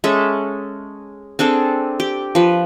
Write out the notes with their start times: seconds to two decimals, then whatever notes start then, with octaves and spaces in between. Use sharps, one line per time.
0.04 G#3 C#4 A4 E5
1.39 C4 D4 G#4 A4
2.00 G4
2.35 F3 B4